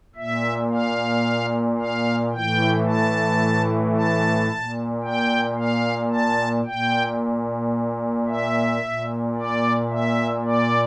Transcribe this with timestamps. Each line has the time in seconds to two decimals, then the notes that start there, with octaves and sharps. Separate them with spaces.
0.16 A#2 E5
0.71 F5
1.78 F5
2.32 A2 E3 G5
2.86 A5
3.95 A5
4.48 A#2
5.03 G5
5.57 F5
6.11 A5
6.65 A#2 G5
8.27 E5
8.81 A#2
9.35 D5
9.89 E5
10.43 D5